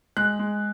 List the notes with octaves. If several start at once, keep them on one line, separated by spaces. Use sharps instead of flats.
G#3 F#6
G#3